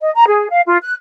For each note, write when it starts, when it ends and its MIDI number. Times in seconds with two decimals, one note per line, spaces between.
0.01 0.11 75
0.15 0.25 82
0.28 0.49 68
0.50 0.61 77
0.66 0.77 65
0.83 0.94 90